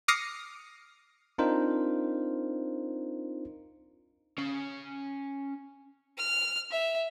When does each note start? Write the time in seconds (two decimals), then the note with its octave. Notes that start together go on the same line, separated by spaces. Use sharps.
0.08 D6 D#6 F6 A#6 C7 C#7
1.38 C4 D4 D#4 F4 A#4 C5
4.38 C#4 F5
6.18 F6
6.71 E5